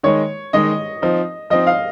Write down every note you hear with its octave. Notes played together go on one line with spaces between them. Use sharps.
D#3 G#3 D#4 C#5
D#3 G#3 D#4 D#5
F3 C4 D#4
F3 C4 D#4 D#5
F5